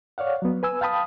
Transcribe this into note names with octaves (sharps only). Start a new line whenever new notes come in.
C#5 D5 F5 F#5
F#3 B3
B4 G#5 E6
F5 G5 A5 B5 D#6